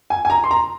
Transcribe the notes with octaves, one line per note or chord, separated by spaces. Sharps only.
G#5
G#5
A#5
C6
A#5